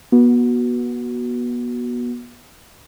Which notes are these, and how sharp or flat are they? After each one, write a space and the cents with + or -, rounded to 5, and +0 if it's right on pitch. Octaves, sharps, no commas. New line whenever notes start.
B3 -30 F#4 +0